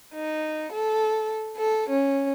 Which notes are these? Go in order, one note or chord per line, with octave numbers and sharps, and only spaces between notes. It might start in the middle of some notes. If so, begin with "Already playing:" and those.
D#4
A4
A4
C#4